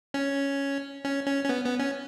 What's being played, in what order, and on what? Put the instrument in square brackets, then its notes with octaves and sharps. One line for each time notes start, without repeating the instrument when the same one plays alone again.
[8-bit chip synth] C#4
C#4
C#4
C#4
B3
B3
C#4